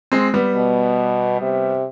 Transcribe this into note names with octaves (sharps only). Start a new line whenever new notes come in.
G#3 C4
G3 B3
B2
C3